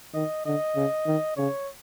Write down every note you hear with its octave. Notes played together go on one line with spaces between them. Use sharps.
D#3 D#5
D3 D#5
C#3
D#3
C#3 C#5